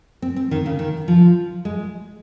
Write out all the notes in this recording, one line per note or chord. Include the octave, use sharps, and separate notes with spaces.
C4
C4
D#3
C#3
D#3
F3
G#3